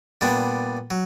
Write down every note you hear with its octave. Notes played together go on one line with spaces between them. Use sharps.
A#2 G3 B3 D4
F#3